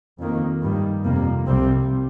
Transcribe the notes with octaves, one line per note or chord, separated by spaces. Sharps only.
F2 D#3 A#3
G2 D#3 G3
F2 C3 G3 A#3
C2 C3 G3 C4